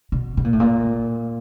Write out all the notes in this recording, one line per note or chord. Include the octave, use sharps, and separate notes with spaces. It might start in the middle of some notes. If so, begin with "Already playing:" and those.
B2
B2
A#2
A2
A#2